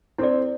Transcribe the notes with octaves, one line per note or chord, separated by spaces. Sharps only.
C4 E4 A4 D5